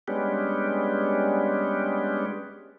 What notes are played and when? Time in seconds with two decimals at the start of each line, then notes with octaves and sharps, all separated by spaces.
0.08 G3 G#3 B3 C#4 D4 G4